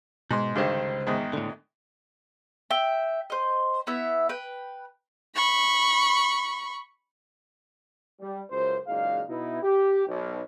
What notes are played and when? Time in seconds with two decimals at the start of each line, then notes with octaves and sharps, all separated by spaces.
0.31 G#2 B2 C6
0.55 C#2 G2 D3 D#3 C5
1.07 E2 G#2 D#3
1.33 A2 D3
2.71 E5 G5
3.30 C5 D#5
3.87 B3 E4 E5
4.29 B4 G5
5.35 B5 C#6
8.20 G3
8.51 C#2 F#2 C5
8.87 F#1 A#2 G#3 D#4 F5
9.28 B2 B3 D#4 E4
9.63 G4
10.06 B1